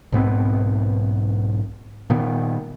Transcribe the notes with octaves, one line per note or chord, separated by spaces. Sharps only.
B1 G#2 B3 C4
A#2 D#3 B3